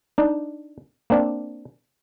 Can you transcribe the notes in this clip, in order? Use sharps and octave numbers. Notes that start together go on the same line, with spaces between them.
D4 D#4
A#3 C4 D4